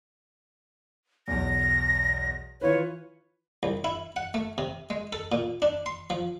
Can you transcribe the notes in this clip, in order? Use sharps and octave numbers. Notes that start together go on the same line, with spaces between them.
B1 E2 A#6
E3 F4 B4 C#5
C2
E4
F#5
A3
C3
G#3
A4
A#2
D4
C6
F3